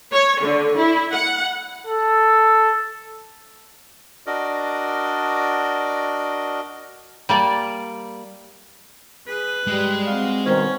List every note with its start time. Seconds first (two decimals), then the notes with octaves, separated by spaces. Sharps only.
0.12 C#5
0.42 D3
0.77 E4
1.12 F#5
1.87 A4
4.27 D4 F#4 A#4 D5 D#5
7.29 G3 A#3 D5
9.27 G#4 B4
9.67 G#2 G3 G#3
10.06 C4 F#4 F5
10.46 B2 D#3 C#4 C5